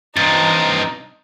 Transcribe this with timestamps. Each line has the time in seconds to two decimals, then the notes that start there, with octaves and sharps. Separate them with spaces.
0.17 G2 C3 D#4 A6